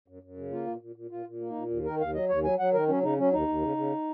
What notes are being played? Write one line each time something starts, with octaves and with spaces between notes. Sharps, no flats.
F#2
F#2
C#3
A#3 F4
A#2
A#2
A#2
A#2 F4
A#2
A#3
D#4
A#2
D#2
D#3 A#4
D#2 F5
F#3 D#5
D#2 C#5
F#3 G#5
F#3 F#5
D#3 A#4
F#3 C#4
C#3 D#4
F#3 C#4
D#2 D#4
D#2
C#3
C#3